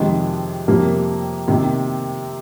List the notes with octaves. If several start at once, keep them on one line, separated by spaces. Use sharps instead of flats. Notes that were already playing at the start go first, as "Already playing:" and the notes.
Already playing: F2 C3 D#3 G#3
F2 C3 G3 A#3
C3 D#3 A#3